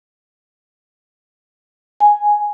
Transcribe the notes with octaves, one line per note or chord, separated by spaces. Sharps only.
G#5